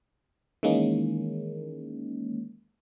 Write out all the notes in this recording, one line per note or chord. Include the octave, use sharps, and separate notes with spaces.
D#3 E3 G#3 A#3 C#4 D#4